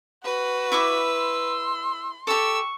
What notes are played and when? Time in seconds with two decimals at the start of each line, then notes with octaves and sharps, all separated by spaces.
0.25 F#4 B4
0.72 E4 C#6 D6 E6
1.12 C6
2.27 G4 A4 C#6 E6